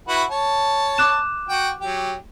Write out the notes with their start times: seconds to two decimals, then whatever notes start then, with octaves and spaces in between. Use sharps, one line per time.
0.08 E4 F#4 B4
0.30 C#5 A5
0.98 D6 F#6 E7
1.49 F#4 G5
1.81 F#3 G4